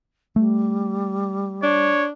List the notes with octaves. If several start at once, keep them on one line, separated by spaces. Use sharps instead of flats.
G3 A3
D4 C#5